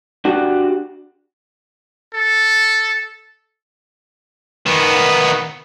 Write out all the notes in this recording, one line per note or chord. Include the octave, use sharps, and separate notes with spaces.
D4 F#4 G4
A4
D#3 B3